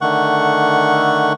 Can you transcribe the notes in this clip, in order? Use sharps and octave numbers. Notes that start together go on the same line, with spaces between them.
D3 D#3 A3 F#5 C#6